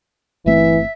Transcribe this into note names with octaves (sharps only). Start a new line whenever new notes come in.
G1 E3 A3 C4 E5